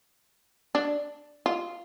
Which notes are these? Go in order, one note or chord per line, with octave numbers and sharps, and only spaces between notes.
D4
F4